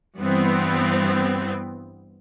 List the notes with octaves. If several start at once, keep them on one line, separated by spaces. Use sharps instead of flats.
G2 E3 B3 C4